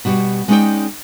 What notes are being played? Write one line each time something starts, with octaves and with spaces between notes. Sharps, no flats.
B2 G3 F#4
G#3 B3 C#4 D#4 D5 G5